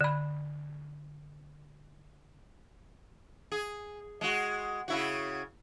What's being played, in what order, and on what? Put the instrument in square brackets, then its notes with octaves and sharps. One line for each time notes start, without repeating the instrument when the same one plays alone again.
[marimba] D3 B5
[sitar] G#4
G#3 F#4
C#3 E4 F#4